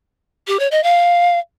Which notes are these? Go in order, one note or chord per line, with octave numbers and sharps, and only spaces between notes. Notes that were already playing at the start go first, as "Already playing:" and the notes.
G4
C#5
D#5
F5